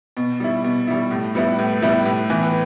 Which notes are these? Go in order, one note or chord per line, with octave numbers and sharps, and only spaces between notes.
B2
G3 E4
B2
G3 E4
A2
G3 B3 E4
A2
G3 B3 E4
A2
E3 B3 E4